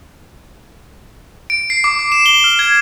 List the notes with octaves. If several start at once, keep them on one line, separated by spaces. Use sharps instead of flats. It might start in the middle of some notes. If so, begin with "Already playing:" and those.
D7
C7
D6
D6
E7
G7
F6
G#6